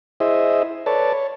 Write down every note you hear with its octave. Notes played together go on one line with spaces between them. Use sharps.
E4 G#4 C5 D#5 E5
A4 B4 C#5 D5 A5
C#5